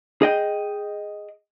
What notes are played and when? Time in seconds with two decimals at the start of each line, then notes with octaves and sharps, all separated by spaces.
0.22 G#4 D#5 G5